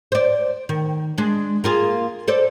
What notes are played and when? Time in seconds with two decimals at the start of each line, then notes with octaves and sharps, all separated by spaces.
0.12 C5 D5
0.69 D#3
1.18 G#3 D4
1.64 A#3 F4 G#4
2.28 A4 C5 D5